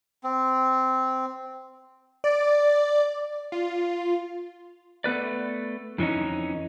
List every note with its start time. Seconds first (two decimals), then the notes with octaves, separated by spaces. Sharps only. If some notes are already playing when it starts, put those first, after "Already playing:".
0.24 C4
2.24 D5
3.52 F4
5.04 A3 B3 B4 D5
5.98 F2 E3 C#4 D#4